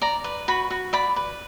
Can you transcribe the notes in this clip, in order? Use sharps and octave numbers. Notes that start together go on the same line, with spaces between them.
D5 A#5
B4
F#4 B5
F#4
D5 B5
B4